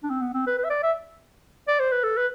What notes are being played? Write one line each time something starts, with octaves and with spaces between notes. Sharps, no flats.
D4
C4
B3
C4
B4
B4
E5
D5
E5
D5
C5
B4
A4
B4